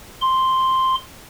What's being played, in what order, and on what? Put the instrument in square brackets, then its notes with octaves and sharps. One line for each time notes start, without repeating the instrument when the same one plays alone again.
[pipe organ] C6